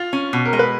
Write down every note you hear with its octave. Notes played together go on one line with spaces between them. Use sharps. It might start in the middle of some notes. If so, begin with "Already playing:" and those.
Already playing: F4
C#4
B2
A#4
G#3
B4